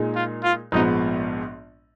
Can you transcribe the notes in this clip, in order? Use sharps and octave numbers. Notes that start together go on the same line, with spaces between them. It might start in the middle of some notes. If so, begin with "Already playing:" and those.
Already playing: A#2 G#3 D#4 G#4
F4
F4
A#1 G#2 F3 G#3 B3 D#4